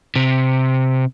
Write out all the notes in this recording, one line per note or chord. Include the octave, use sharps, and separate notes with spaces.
C3